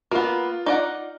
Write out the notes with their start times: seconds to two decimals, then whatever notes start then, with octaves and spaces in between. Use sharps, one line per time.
0.11 A#3 B3 F4
0.66 D#4 D5 F#5